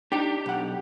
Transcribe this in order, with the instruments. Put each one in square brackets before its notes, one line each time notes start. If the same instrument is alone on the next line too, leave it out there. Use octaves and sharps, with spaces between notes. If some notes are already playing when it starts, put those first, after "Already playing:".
[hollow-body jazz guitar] D4 D#4 [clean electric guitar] G4 G5
[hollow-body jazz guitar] B1 F#5